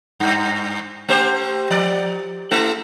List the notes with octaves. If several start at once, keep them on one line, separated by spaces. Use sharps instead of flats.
G2
A3 G4 C5
F3 D5
A3 E4 A4